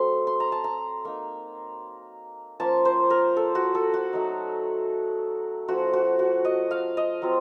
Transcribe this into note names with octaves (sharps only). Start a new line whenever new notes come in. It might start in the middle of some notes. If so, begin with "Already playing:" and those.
Already playing: F#3 A3 C4 C6
C6
A#5
A5
A#5
A#3 D#4
F3 A#3 C#4 F4 A5
C5
A#4
A4
F#4
A4
F#4
F#3 A3 D#4
F3 A3 C#4 F#4
F#4
F#4
D#5
F5
D#5
F#3 C4 F4